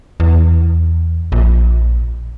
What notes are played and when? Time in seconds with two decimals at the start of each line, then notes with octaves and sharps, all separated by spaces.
0.20 E2
1.32 A#1